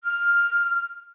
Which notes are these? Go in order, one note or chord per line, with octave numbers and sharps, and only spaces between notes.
F6